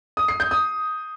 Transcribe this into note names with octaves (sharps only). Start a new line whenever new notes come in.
D#6
C7
G6
D#6